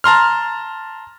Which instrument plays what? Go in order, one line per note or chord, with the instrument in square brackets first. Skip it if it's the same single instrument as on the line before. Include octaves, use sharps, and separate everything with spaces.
[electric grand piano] A5 A#5 C6 F6